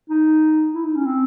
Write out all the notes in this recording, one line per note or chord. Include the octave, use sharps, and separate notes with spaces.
D#4
E4
D#4
C#4
C4